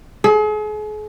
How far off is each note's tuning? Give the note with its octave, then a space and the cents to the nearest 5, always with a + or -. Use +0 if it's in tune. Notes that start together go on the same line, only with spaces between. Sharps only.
G#4 +40